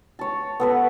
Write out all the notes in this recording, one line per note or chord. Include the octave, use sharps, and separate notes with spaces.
C#5 A5
B3 A4 B4